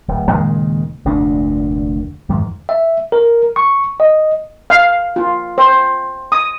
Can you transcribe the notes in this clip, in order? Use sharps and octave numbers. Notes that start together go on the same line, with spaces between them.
D1
D#2 A#2 C#3 G#3
F1 D2 A#2 D4
E2 G#2 D#3 F3
E5
A#4
C#6
D#5
F5
F4
C5
D#6